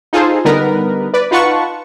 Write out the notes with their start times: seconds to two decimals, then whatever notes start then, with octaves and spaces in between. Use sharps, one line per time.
0.13 D#4 F4 G#4 A4 C5
0.45 D3 G3 B3 D#4 A#4 B4
1.14 B4 D5
1.31 D#4 F4 B4 F#5 A5 C#6